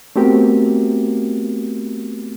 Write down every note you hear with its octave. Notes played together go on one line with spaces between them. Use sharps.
A3 B3 C4 F#4 G4 A#4